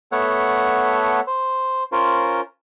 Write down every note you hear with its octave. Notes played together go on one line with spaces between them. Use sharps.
A3 B3 A4 C#5 F#5
C5
C#4 F4 A#4 C5